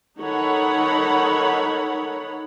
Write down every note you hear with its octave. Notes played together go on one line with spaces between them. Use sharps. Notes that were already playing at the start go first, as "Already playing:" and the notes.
D#3 D#4 A4 C#5 F#5 B5